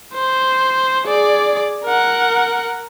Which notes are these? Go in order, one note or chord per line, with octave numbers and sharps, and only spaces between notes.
C5
G#4 D5
A#4 F#5